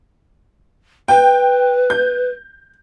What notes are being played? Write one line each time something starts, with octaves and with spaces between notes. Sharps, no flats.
B4 G5
G6